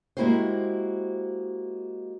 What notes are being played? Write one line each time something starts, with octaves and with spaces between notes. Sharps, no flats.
G#3 A#3 E4 F#4 G4 C5